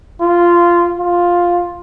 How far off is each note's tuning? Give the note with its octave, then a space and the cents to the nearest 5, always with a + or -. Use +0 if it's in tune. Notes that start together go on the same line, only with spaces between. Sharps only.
F4 -10
F4 +5